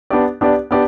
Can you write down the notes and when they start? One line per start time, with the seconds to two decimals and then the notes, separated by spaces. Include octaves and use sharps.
0.10 B3 D4 G4 D5
0.41 B3 D4 G4 D5
0.71 B3 D4 G4 D5